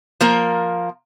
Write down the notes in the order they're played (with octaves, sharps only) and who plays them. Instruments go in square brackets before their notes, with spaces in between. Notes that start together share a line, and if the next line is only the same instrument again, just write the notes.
[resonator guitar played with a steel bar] F3 A#3 A#4